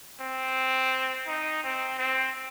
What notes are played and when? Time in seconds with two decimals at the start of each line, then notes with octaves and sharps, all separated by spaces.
0.21 C4
1.28 D#4
1.64 C4
1.99 C4